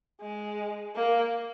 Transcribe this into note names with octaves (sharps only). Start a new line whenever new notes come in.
G#3
A#3